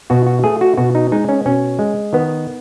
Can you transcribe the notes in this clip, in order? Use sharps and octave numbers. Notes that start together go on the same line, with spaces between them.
B2 F#4
F#4
A3 G#4
F#4
B2 F#4
D#4
G#3 D#4
C#4
B2 C#4
G#3
D#3 B3